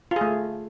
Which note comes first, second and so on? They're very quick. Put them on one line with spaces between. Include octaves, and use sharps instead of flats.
F4 G#4 A3